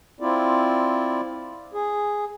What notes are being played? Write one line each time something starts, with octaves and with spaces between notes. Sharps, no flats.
C4 E4 F4 D5
G#4